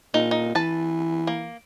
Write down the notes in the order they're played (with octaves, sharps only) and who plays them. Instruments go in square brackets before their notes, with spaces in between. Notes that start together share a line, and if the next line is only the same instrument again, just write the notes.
[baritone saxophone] A#2 [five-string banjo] D#4
[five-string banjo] D#4
[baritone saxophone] E3 [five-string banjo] B4 A5
[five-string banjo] A#3